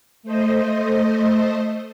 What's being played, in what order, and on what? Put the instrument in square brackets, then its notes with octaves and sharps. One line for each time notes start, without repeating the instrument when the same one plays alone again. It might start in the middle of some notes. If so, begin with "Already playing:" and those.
[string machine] A3 C5 D#5